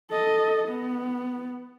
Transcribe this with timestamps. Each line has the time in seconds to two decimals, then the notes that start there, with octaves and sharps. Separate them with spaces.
0.11 A4 D#5
0.68 B3